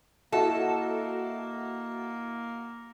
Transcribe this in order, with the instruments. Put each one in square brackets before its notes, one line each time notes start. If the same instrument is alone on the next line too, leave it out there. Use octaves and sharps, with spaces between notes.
[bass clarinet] A#3 [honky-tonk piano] E4 F#4 [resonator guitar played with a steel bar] A4 [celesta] D#5 F#5